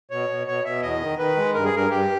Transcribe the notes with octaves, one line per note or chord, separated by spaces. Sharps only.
B2 C#5
B2
B2 C#5
B2 E5
E2 D#5
D#3
D#3 B4
G#3
G2 A#4
G#4
G2 A#4
G2 G4